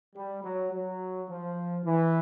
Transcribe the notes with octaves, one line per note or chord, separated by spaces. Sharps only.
G3
F#3
F#3
F3
E3